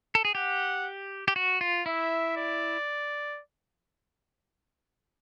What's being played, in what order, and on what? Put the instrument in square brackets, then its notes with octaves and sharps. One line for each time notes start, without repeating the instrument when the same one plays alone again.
[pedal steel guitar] A4
G#4
[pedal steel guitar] G4 [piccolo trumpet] F#5
[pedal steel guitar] G4
F#4
F4
[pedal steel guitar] E4 [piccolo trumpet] E5
[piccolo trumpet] D5